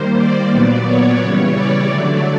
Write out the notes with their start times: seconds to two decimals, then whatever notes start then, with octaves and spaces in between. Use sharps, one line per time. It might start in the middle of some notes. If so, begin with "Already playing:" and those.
Already playing: D#3 G3 A#3 C5
0.18 D5
0.52 A#2 F#3 B3
0.86 C#5
1.20 C#3 E3 G3
1.54 D5
1.89 D3 F#3 A3